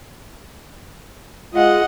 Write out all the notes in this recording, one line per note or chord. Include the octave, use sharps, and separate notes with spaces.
G#3 F4 D#5 F#5